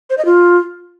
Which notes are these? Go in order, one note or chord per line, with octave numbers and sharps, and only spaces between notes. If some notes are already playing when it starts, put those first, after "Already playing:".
C5
D#5
F4